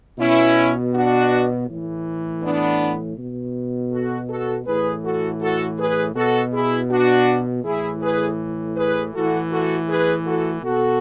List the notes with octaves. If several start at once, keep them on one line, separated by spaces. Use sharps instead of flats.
B2 C#4 E4
D4 F#4
A2 E3
B3 D4
B2
F#4 A4
F#4 A4
A2 E3 G#4 B4
F#4 A4
F#4 A4
G#4 B4
B2 F#4 A4
E4 G#4
D4 F#4
A2 E3 E4 G#4
G#4 B4
G#4 B4
A2 E3 F#4 A4
F#4 A4
G#4 B4
F#4 A4
B2 F#4 A4